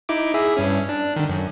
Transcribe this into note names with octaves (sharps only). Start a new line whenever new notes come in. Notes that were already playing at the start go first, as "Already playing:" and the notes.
D#4 E4 D6
E4 G#4 E5
G2 C#4
D4
D3 D#3
F#2